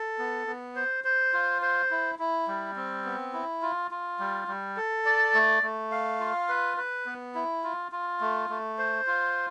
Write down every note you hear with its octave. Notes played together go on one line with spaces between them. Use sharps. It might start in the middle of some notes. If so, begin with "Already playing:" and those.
Already playing: A4
B3
B3
C5
C5
F4
C5
E4
E4
G3
C4
B3
E4
F4
F4
G3
G3
A4
D5
A3
A3
F5
F4
B4
B4
B3
E4
F4
F4
A3
A3
C5
F4